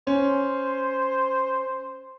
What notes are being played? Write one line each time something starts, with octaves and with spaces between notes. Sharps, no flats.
C#4 C5